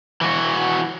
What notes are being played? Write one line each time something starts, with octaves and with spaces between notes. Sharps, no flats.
E3 F#4